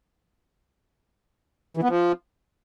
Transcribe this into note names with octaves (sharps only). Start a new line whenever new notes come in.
E3
B3
F3